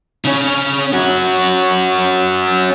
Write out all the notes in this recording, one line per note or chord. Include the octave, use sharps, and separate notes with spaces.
C#3 C#4
C#4 F#4